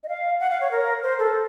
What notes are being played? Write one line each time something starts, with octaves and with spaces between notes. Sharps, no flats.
D#5
F5
F#5
F5
C#5
A#4
C5
A4